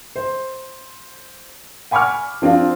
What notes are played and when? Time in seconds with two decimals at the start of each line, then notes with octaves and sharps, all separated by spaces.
0.16 C5
1.91 F#5 G#5 B5 C#6 D6 F6
2.42 F3 C4 D4 F4